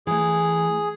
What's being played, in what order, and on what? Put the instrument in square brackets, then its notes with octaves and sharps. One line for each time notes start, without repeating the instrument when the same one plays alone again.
[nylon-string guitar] E3 A3 [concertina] G#4